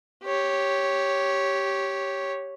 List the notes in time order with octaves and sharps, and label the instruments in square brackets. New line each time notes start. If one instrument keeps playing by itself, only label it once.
[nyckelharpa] G4 C#5